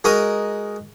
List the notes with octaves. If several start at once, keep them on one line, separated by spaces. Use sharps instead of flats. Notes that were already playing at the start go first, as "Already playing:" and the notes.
G#3 F#4 A#4 D#5 A#5 D#6